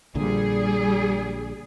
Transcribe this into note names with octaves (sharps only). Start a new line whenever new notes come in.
A#1 A#2 D3 G3 G#4